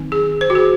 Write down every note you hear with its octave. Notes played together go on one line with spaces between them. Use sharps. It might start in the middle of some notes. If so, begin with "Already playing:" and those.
Already playing: D#3 F#3 C4 D#4
G#4
C5
F#4
G#4